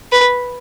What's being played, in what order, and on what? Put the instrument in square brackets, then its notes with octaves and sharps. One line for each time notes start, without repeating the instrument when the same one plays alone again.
[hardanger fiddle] B4